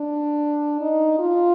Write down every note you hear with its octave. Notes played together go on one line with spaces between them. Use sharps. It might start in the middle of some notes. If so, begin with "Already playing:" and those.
Already playing: D4
D#4
F4